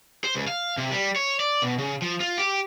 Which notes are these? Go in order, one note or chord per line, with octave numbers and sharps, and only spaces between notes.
C5
C#2
F5
C3
G3
C#5
D5
B2
C#3
F3
F4
G4